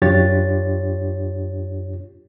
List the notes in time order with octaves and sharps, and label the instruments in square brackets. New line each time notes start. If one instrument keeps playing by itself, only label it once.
[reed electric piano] F#2 D4 F4 G4 C#5 A6